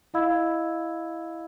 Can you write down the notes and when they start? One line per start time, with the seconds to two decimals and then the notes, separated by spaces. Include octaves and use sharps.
0.14 E4 D#5 F5 B5 E6 G#6